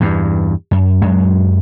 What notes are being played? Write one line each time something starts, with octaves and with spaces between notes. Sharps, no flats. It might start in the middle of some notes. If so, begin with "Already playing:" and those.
E2 G2
F#2
F#2 F#3 G#3